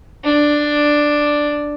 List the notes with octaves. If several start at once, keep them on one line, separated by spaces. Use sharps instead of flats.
D4